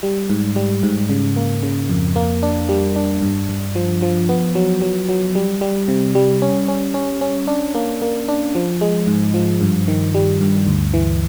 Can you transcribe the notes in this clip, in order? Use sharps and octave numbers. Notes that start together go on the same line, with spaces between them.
G3
G#2
G3
G#2
C#3
A#3
C#3
F2
A#3
D4
G3
D4
G2
G2
F3
F3
B3
F#3
F#3
F#3
G3
G3
C3
G3
C#4
C#4
C#4
C#4
D4
A#3
A#3
D4
F3
G#3
G#2
F3
G2
D#3
G3
G2
D2
E3